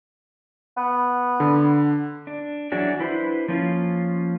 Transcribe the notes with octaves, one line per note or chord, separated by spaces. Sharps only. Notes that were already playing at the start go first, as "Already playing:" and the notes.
B3
D3
D4
E3 F#3 D4 F#4 G#4
D4 E4 B4 C5
F3 A#3 C#4 F4